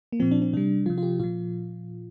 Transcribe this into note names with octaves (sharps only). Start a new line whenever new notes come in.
A#3
A#2 F3 C4
D4
C4
C3 G3 D4
C3 F3 F4
F4
G4
A#2 F3 F4